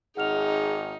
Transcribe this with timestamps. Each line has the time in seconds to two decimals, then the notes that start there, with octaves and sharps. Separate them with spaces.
0.17 G#1 D#4 G#4 F#5 F6 F7